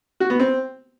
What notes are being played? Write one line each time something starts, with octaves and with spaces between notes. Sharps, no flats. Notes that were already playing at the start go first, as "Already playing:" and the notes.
F#4
B3
C4